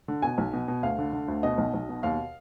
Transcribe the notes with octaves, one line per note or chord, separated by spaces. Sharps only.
D3
B2 G#5
B1
B2
B2
D2 F5
D3
D3
D2
B2 D#5
B1
B1
B2
D#2 F5